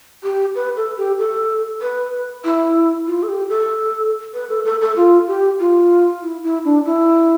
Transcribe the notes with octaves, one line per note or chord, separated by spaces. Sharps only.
G4
B4
A4
G4
A4
B4
E4
F4
A4
G4
A4
B4
A4
A4
A4
F4
G4
F4
E4
E4
D4
E4